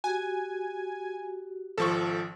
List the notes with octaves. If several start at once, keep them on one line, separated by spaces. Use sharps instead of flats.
F#4 G4 G#5
G#1 F3 A4 C#6